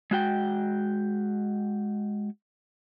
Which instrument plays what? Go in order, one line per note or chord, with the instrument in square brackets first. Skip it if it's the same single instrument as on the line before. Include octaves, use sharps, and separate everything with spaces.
[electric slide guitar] G#3 F#4 G5